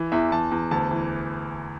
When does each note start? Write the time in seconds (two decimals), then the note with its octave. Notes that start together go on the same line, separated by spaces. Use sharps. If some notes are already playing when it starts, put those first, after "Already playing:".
Already playing: E3
0.12 E2 E5
0.32 E2 A5
0.51 E2
0.71 D2 A5
0.91 E3